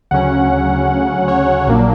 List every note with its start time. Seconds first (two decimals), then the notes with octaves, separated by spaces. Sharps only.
0.11 D2 C#3 F#3 C#4 F#5
1.28 C#5
1.67 A#1 A#2 F#3 A#3 D4